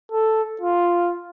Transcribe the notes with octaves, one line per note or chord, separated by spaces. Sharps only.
A4
F4